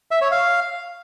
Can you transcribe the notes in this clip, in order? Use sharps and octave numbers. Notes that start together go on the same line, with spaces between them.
E5
C#5
F5